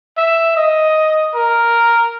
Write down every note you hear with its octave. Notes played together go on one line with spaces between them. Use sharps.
E5
D#5
A#4